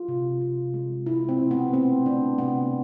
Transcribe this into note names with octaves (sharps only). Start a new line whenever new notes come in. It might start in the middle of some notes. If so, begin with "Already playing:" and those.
Already playing: F4
C3
C3
G#3
G#3 E4
C4
B2
B3
A3 C4
A3 D4
C3 B3